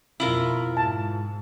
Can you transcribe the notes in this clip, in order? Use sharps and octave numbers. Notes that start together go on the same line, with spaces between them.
F2 B2 E4 F4 A#4
G#2 A5